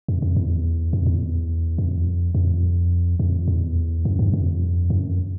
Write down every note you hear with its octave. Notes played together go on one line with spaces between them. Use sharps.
F2
F2
E2
F2
E2
F2
F2
F2
E2
F#2
G2
F2
F#2